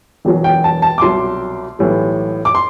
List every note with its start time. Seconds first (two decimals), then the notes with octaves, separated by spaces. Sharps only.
0.25 E1 E2 B2 F#3
0.44 G5
0.64 A5
0.82 A5
0.98 D6
1.01 C2 B2 F#3 C6
1.79 B1 A2 E3 G3
2.45 D6
2.55 C6